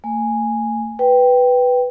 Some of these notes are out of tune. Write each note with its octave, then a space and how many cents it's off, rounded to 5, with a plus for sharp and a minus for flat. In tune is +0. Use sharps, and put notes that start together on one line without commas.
A3 +45 G#5 -5
B4 +0 G5 +0